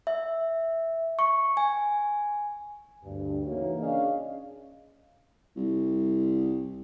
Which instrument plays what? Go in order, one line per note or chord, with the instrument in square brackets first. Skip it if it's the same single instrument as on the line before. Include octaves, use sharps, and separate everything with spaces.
[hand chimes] E5
C#6
G#5
[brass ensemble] D2 G2
C#3 E3 A#3 D#4 F#4 C#5
C#4 D4 G#4 D#5 F5
[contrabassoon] C2